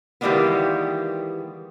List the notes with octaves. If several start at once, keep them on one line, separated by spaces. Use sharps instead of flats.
D#3 E3 G3 G#3 A#3 B3